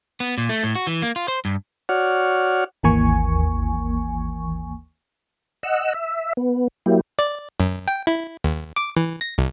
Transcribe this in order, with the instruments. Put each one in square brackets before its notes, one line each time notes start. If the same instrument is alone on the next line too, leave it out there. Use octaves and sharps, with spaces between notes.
[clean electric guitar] B3
A#2
A3
A2
F#4
E3
A#3
F4
C5
G2
[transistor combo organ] F#4 C#5 D5 F#5 F6
[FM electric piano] G#1 D#2 E3 A#3 G#5 C#6
[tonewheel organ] D#5 F#5 E6
E5
B3
F#3 A#3 E4 G4
[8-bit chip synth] D5
F#2
G5
E4
D#2
D6
E3
A#6
C2